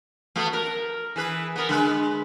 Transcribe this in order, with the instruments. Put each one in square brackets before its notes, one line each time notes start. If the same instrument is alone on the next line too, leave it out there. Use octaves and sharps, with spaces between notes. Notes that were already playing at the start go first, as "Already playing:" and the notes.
[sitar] A3 B3 F#4
A#4
E3 G#4 B4
B3 A#4
D3 G#3 B4